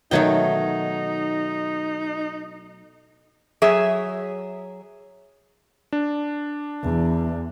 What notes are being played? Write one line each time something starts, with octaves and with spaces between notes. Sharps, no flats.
B2 D#3 F#3 A3 D#4 C#5 G5
F#3 G#4 C#5 E5
D4
E2